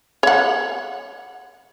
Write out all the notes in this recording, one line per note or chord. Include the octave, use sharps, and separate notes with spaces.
C#5 F#5